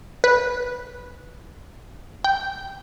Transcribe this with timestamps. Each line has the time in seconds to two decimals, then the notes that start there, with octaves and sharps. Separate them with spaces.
0.24 B4
2.24 G5